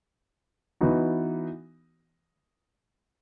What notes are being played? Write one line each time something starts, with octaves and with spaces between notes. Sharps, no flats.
E3 B3 D#4 F#4